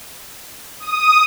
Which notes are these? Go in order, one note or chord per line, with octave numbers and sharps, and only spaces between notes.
D#6